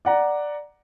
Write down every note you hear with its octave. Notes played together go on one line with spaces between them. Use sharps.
D5 F#5 A#5